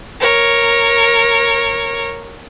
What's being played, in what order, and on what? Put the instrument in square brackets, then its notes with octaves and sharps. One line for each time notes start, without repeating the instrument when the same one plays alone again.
[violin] A#4 C#5